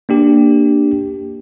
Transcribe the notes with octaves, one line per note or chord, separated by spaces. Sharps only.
A#3 D4 G4